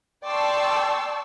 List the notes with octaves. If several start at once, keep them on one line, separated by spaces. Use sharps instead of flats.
D5 G5 A5 C6 C#6 E6